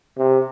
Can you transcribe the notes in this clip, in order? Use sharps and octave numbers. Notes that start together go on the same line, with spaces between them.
C3